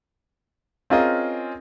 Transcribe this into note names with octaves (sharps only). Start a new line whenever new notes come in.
C4 C#4 F4 G#4 A#4 D#5